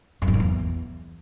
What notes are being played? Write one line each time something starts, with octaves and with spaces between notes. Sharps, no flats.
F#2
G2
A#2
E2